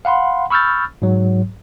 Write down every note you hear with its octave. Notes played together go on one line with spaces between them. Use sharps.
F5 F#5 B5 C6
B5 C#6 E6 F6 G6 A6
G#2 F#3